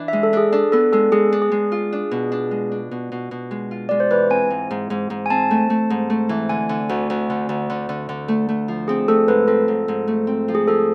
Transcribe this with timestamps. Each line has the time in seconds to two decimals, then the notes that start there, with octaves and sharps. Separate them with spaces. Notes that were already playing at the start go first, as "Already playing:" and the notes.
Already playing: E3 D4
0.08 G#3 E5
0.23 A4
0.33 D4 G#4
0.52 D4 A4
0.72 B3 A4
0.93 G#3 A4
1.12 G#3 G#4
1.32 D4
1.42 G#4
1.52 G#3
1.72 F4
1.93 D4
2.11 B2
2.32 D4
2.51 G#3
2.72 D4
2.91 B2
3.12 B2
3.31 B2
3.51 G#3
3.71 F4
3.89 G#3 D5
4.00 C5
4.11 E3 B4
4.30 C4 G#5
4.50 G#2
4.71 G#2
4.90 G#2
5.10 G#2
5.26 G#5
5.30 C4 A5
5.51 A3
5.70 A3
5.90 G#2
6.10 A3
6.29 E3
6.49 D3 G#5
6.69 D3
6.89 D2
7.10 D2
7.30 D3
7.49 D2
7.70 D3
7.89 D3
8.09 D3
8.28 A3
8.49 A3
8.68 F3
8.88 C4 G#4
9.08 A3 A4
9.28 G#2 B4
9.48 C4 A4
9.68 G#2
9.88 G#2
10.08 A3
10.27 C4
10.48 F3
10.55 G#4
10.68 F3 A4